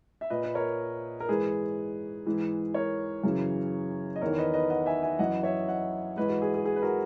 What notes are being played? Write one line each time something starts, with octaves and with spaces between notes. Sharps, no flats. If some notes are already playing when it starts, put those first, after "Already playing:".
E5
A#2 B4 D#5
B4
A#4 C#5
A#4
G#2 E3 G#4 B4
G#2 E3
A#4 C#5
F#2 C#3 E3
D#5
E2 D#3 A#4 C#5
B4 D#5
B4 D#5
D#5 F#5
E5 G#5
E5 G#5
F#2 E3 D#5 F#5
C#5 E5
D#5 F#5
G#2 E3 B4 D#5
F#4
G#4
G#4
G#4
B4
F#4 A#4